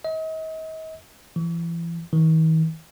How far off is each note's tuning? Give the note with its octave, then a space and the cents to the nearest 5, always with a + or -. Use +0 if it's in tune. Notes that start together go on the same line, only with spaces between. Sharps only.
D#5 +40
E3 +35
D#3 +45